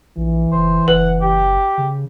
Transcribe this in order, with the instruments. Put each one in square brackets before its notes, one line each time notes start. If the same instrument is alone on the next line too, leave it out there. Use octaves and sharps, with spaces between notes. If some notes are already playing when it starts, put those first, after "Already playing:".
[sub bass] A#1 [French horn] E3
[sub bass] F#1 [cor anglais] C5
[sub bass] F#1 [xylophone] B4 [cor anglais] F#5
[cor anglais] G4
[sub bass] C#3